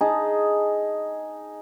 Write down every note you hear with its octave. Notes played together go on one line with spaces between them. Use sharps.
D#4 G#4 A5